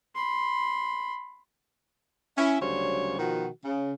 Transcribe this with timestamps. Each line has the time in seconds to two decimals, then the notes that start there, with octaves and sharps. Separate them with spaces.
0.15 B5 C6
2.38 C#4 E4 E5
2.61 D2 C#3 F#3 G3 C5 C#5
3.19 B2 D#3 F3 F#4
3.64 C#3